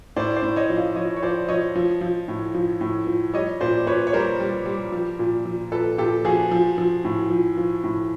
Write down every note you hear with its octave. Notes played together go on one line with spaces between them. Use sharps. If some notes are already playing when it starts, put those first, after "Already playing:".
A2 C5 D5
C5 D5
A2
C#5 D#5
F3
D#5 F5
F3 C#5 D#5
C#5
F3 C5 D5
F3 C#5 D#5
F3
F3
A2
F3
A2
F3
G3 C#5 D#5
A#2 C5 D5
A#2 B4 C#5
C#5
G3 A#4 C5
G3
G3
F3
A#2
F3
A#2 A4 B4
A#2 G4 A4
F3 F#4 G#4
F3
F3
A2
F3
F3
A2